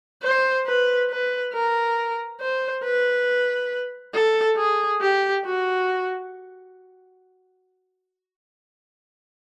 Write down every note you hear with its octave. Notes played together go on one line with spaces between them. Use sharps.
C5
B4
B4
A#4
C5
B4
A4
G#4
G4
F#4